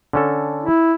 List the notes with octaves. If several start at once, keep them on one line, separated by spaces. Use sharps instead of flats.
D3 C#4 A4
E4